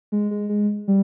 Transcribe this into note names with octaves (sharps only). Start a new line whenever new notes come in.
G#3
G#3
G#3
G3